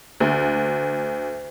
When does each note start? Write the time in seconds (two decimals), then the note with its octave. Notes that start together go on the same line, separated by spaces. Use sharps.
0.20 D2